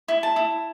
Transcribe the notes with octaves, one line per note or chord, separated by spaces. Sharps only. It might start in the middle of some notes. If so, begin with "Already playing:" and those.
E4
A5
E4